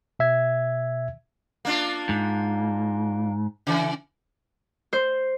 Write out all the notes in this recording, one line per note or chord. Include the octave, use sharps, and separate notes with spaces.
B2 E5 G#6
A#3 D4 F4
G#2
C#3 E3
C5